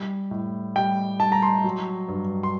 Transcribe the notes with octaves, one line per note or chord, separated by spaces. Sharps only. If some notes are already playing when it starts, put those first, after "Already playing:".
Already playing: G3
A2
G3 G5
G3 A5
A#5
C6
F#3
G2
C6